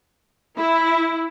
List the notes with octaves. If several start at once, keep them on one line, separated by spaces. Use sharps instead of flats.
E4